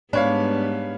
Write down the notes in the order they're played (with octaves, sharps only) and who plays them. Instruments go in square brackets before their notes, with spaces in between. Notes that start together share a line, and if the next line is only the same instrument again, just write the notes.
[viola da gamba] G#2 G3 B3 [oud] D4 [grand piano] B4 C#5 F5